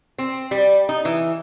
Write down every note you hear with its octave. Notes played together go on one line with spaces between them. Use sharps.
C4
G3
D#4
E3